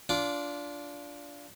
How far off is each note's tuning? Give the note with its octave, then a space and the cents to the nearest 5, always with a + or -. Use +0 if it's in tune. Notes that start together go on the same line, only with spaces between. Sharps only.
D4 -20 F4 -5 D6 -5